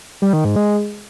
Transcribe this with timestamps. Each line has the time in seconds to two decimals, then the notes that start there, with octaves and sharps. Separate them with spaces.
0.22 G3
0.33 D#3
0.45 G#2
0.56 G#3